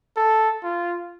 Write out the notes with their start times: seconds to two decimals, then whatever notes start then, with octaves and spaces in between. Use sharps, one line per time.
0.17 A4
0.63 F4